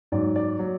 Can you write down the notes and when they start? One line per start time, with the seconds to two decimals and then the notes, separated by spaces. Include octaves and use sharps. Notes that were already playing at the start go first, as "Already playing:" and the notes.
0.12 G#2 F#3 D5
0.36 D5
0.59 F#3